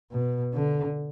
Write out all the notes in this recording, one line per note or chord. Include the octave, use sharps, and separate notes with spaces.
B2
D3